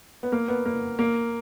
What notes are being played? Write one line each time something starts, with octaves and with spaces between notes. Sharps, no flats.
B3
A#3
B3
A#3
A#3